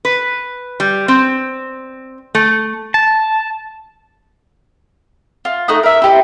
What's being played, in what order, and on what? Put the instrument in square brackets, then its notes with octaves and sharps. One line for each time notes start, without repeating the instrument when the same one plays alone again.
[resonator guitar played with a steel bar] B4
G3
C4
A3
[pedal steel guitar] A5
[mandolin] F4
A3 D#4 F#5 D#6
A#4 E5
E4 G4 D#5